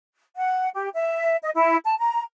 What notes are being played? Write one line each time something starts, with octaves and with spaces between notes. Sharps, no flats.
F#5
G4
E5
D#5
E4
A5
A#5